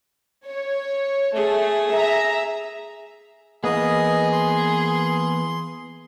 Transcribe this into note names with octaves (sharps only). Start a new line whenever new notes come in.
C#5
A3 G#4
E5 A#5
E3 A#3 B3 G#4 D#5
C6